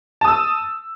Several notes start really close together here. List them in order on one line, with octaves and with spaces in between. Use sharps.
A5 D#6 E6